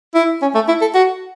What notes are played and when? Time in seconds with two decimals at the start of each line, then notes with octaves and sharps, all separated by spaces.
0.15 E4
0.42 C#4
0.55 A3
0.68 E4
0.81 A4
0.94 F#4